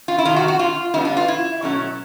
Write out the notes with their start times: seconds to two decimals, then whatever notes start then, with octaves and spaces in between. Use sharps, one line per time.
0.08 F4
0.18 E4
0.25 F2 C3 D#3 F4
0.36 F#4
0.48 F#4
0.59 F4
0.94 D3 G3 B3 D4 E4
1.05 F4
1.17 F4
1.28 E4
1.62 B2 F#3 A3 C#4 E4